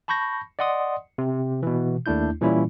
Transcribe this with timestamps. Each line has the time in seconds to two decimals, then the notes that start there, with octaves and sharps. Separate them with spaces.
0.08 A5 B5 C#6 G6 A#6
0.59 D5 D#5 F#5 C6 D#6
1.18 C3
1.63 B2 E3
2.06 D#2 A3 D4 E4 G6
2.41 A#2 E3 G3 C#4 E4